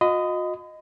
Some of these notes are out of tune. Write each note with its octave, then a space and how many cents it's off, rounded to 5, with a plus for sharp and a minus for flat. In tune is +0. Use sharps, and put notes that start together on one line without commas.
F#4 -45 D#5 +0 B5 +40